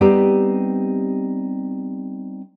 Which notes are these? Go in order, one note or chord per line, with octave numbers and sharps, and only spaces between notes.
G3 B3 C4 D#4 G4